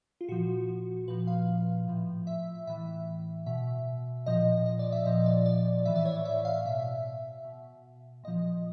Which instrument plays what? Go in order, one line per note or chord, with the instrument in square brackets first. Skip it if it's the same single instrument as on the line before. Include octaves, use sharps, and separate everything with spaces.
[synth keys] F4
A#2 F3 F#4
A#2 F3 B4
F5
A2 F3
E5
A2 E3 E5
B2 E5
A#2 F3 D#5
D#5
D5
E5
A#2 F3 D#5
D5
D5
A2 E3 E5
D5
C#5
D5
E5
F5
B2 E5
B2
A#2 F3 D#5